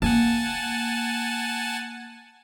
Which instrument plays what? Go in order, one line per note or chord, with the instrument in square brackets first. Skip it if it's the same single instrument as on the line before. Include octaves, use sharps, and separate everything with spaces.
[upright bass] A#3 [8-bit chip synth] F#5 G#5 A5